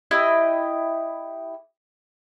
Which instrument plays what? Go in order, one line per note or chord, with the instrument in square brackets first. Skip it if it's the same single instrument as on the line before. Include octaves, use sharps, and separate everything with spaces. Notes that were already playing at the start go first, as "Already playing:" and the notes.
[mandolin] E4 G4 D#5